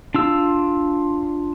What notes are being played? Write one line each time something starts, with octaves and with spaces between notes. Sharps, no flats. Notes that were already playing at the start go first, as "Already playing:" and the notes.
D4 F4 E6